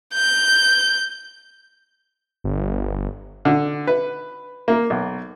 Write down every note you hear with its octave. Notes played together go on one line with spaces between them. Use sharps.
G6
G1
D3
B4
A#3
B1